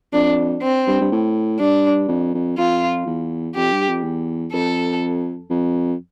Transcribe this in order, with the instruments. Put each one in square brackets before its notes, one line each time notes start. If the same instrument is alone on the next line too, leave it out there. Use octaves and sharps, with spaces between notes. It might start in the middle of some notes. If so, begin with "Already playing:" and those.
[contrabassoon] F2 [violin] D4
[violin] C4
[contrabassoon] G2
G2
A2
[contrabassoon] G2 [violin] D4
[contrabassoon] F2
F2
[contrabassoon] F2 [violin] F4
[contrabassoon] E2
[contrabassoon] F2 [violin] G4
[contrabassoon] G2
F2
E2
[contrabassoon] F2 [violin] A4
[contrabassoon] F2